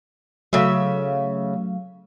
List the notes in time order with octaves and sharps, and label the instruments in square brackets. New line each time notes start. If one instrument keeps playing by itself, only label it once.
[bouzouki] C#3 E5 [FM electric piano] F#3 A3 F5